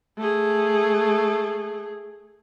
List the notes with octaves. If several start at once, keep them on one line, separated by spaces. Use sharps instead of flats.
A3 G#4